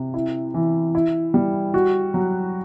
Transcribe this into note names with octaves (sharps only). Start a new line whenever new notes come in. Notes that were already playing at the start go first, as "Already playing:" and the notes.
Already playing: C3
E4
E3
E4
G3
F#4
F#3